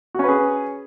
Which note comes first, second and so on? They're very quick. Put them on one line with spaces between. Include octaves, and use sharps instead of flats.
F#4 C#4 B4 G#4